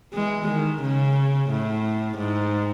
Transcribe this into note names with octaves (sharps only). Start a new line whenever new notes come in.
E3 G#3
D#3
C#3
A2
G#2